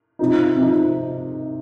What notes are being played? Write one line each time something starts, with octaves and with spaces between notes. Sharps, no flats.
C3 F3 D#4
C3 F3 D#4